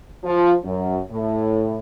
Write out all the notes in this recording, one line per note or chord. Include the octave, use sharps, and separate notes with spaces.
F3
F#2
A2